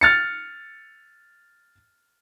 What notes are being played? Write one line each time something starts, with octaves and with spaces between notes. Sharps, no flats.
F6 A6 C#7